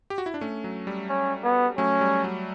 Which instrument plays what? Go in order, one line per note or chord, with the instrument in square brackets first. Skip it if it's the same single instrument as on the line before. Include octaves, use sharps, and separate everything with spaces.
[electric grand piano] G4
F#4
E4
D4
A3 C#4
F#3
G3
[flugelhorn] C#4
B3
[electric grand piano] F#3 A3 [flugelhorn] C#4
[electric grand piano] G3
F#3